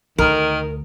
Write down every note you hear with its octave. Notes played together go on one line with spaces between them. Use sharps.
D2 D#3 A#4